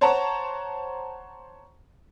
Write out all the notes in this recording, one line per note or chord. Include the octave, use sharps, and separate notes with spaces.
C5 C#5 F#5 A5 A#5 C#6